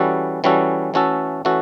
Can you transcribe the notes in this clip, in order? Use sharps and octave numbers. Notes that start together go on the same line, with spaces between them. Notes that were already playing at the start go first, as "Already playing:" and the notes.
Already playing: E3 G3 C#4 F#4 A4
E3 G3 C#4 F#4 A4
E3 A3 C#4 F#4 A4
E3 A3 C#4 F#4 A4